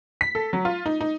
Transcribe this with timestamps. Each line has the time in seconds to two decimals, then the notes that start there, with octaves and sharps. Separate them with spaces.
0.21 B6
0.35 A4
0.53 F#3
0.65 F4
0.86 D#4
1.01 D#4